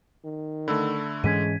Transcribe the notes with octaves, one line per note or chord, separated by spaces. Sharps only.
D#3
D3 A3 B5 E6
G#2 E3 G#3 C#4 G#6 B6 D#7